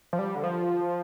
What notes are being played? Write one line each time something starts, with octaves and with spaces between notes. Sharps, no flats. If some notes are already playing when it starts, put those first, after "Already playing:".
F3
G3
D3
F3